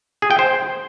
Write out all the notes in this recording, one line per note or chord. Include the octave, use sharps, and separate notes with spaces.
G#4
G5
C5